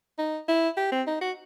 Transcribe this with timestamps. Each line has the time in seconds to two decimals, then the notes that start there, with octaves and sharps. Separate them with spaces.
0.19 D#4
0.49 E4
0.77 G4
0.92 C4
1.07 D#4
1.21 F#4